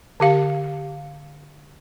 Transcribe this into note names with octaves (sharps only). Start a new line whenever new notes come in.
D3 G4 F5